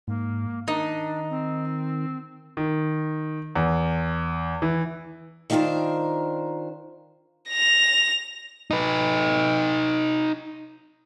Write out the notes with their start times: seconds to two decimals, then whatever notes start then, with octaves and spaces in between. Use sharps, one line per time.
0.08 G#2 A#3
0.68 D#3 D4 D#4
1.30 C4
2.57 D#3
3.56 E2
4.62 E3
5.50 D#3 D4 F4 A4 A#4 C5
7.50 A#6 F7
8.71 D#4 B4